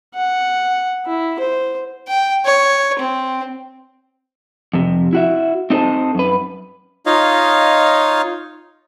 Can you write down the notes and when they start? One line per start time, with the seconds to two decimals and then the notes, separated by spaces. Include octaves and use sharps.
0.15 F#5
1.06 E4
1.40 C5
2.08 G5
2.45 C#5
2.99 C4
4.74 F2 C3
5.13 E4 F#4 E5
5.70 C4 D#4 A4 C5 A5
6.15 F#2 B4
7.06 D#4 F4 C#5 D#5 F5